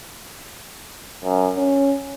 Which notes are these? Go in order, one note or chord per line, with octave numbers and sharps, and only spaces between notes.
F#2
C#4